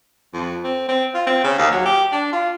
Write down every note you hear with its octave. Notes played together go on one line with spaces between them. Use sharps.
F2
C4
C4
F4
C4
C#3
D#2
F#3
G4
D4
F4